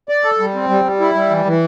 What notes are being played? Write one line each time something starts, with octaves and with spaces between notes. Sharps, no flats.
D5
A4
G3
C4
G3
G3
E4
G3
E3
E3